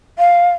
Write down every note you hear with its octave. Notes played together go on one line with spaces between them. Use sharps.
F5